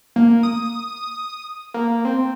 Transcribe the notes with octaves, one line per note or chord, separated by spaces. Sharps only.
A#3
D#6
A#3
C4